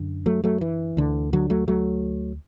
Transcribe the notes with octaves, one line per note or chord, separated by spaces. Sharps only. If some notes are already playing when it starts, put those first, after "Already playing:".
Already playing: F#2 D3
F#3 A3
F#3 A3
E3
D2 D3
D3 F#3
F#3 A3
F#3 A3